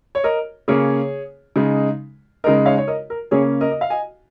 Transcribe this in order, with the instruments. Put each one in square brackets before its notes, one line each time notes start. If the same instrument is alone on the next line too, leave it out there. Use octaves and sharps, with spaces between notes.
[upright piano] C#5
A#4 D#5
C#3 A#3 C#4 G#4 C#5
C#3 G#3 D#4
C#3 G#3 D#4 A#4 D#5
C#5 F5
C#5
A#4 D#5
A#4
C#3 A#3 C#4 G#4 C#5
A#4 D#5
D#5
F5
D#5 G#5